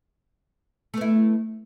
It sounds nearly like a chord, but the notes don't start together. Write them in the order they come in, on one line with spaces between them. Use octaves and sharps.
A3 B3 E4